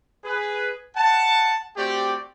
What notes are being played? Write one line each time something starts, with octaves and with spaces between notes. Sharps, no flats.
G#4 B4
F#5 A5
A3 C4 F#4 G4 D5 G5